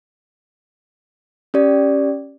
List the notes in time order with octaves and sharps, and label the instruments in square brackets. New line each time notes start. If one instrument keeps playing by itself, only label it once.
[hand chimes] C#4 G4 D5